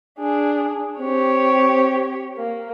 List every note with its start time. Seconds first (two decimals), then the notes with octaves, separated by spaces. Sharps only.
0.19 D4 G#4
1.00 C4 G4 C#5
2.37 A#3